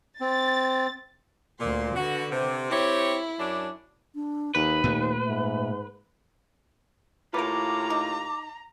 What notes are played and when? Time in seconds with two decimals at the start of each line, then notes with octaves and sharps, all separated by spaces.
0.21 C4 A6
1.59 D2 A#2 C6
1.95 D3 F#4 B4
2.30 C3
2.70 C4 E4 G4 C#5
3.38 F#2 C#4 D4
4.15 D4
4.55 D#2 D#4 B4
4.84 D#2 A#2 A3
5.27 G#2 E5
7.34 D#2 A2 F4 A#4 B4 A#5 D6
7.90 D#4